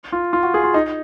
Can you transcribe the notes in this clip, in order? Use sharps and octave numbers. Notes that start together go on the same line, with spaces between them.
F4
F4
F#4
G#4
F4
D#4